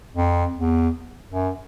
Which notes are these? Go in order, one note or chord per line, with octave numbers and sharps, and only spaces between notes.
F2
E2
F#2